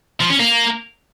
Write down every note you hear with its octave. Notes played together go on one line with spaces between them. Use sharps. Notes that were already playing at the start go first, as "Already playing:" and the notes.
F3
C#4
A#3